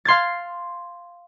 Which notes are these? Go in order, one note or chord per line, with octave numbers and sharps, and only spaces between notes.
F5 C6 G#6 A6